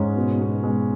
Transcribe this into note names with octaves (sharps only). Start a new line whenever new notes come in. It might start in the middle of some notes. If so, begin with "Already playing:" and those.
Already playing: G#2 G#3 C#4
B2
B2
G#3